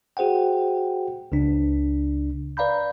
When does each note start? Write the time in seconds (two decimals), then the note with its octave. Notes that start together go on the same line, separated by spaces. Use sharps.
0.17 F#4 G#4 C5 F#5 G5
1.32 C#2 C#3 D4
2.57 B4 D5 F5 A#5 B5 G6